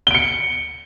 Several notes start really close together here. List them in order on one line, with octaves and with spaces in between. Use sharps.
G7 D7 C#7